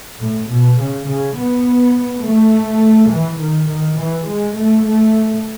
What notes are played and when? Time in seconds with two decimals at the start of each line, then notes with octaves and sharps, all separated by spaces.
0.20 A2
0.49 B2
0.78 C#3
1.07 C#3
1.37 B3
2.23 A3
3.11 E3
3.41 D#3
3.69 D#3
3.98 E3
4.28 G#3
4.57 A3
4.86 A3